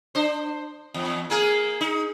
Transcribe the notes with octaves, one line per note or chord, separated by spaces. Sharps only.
D4 C5
E2
A#3 G#4 A#4
D#4